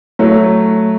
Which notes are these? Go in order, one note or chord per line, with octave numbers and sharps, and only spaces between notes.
F#3 A3